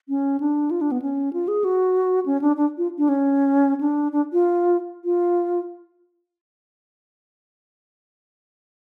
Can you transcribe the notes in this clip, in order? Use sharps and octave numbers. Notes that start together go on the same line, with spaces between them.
C#4
D4
F4
D4
B3
C#4
F4
G#4
F#4
C#4
D4
D4
F4
D4
C#4
D4
D4
F4
F4